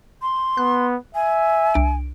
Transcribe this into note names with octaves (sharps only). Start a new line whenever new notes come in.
C6
B3 F#6
E5 G#5
C2 D4 D7